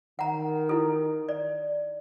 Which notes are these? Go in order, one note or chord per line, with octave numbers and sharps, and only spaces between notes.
D#3 F#5 A#5
E4 A4
D5